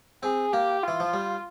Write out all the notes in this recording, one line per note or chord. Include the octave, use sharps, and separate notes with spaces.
C4 G#4
A#3 G4
E3 F4
F3
G3